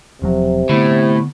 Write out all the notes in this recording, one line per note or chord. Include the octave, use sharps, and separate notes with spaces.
E1 C3 F3 F#3
A2 D3 B3